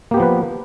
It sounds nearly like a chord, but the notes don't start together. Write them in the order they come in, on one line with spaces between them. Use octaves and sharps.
A#3 G4 B3 F3 B4